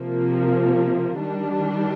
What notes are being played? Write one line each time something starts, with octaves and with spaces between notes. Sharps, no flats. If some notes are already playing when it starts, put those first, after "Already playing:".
Already playing: C3 F3 A#3
D#3 G3 D4